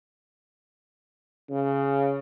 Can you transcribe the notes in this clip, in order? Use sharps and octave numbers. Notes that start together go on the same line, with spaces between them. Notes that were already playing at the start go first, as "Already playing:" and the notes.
C#3